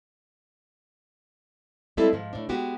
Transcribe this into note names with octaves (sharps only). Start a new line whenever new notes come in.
G3 G#3 C4 E4 A4
G#2 F3
A2 D4
G#3 B3 F#4 G4